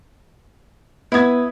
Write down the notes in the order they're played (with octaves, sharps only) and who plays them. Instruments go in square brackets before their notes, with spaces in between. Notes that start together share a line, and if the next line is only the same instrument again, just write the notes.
[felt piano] B3 G#6 [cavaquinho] E4 D#6